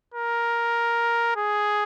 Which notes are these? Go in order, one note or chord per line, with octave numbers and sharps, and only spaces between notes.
A#4
G#4